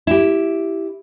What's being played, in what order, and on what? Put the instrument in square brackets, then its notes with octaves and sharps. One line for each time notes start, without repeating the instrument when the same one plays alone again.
[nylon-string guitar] E4 G4